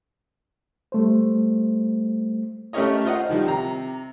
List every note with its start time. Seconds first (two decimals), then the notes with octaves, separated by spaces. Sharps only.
0.92 G3 A3 C5
2.73 A3 C#4 G4 A#4 C#5 D#5
3.05 F4 C5 D#5 F#5
3.29 D#3 F3 G3
3.46 C3 A#5